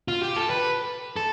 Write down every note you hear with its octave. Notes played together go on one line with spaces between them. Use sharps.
F4
G4
A4
B4
A4